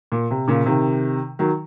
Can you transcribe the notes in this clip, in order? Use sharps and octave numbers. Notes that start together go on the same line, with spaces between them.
A#2
C3
A#2 C#3
C3 D#3
D#3 F#3